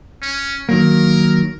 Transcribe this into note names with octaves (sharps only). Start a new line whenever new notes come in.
C#4
D#3 F#3 A#3 A#4